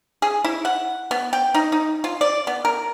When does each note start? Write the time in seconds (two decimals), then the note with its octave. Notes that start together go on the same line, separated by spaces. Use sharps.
0.22 G#4
0.44 E4
0.65 F#5
1.11 B3
1.33 G5
1.54 D#4
1.72 D#4
2.04 F4
2.21 D5
2.47 B3
2.65 A#4